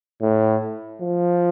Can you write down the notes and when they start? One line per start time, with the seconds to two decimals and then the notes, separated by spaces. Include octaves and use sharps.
0.21 A2
1.01 F3